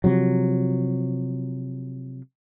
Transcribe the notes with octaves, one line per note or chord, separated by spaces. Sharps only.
C3 F3 F#3